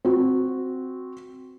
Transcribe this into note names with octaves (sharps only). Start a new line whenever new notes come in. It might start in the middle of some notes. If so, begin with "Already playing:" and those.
C4 F#4